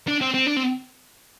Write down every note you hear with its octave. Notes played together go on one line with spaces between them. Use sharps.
D4
C4
C4
D4
C4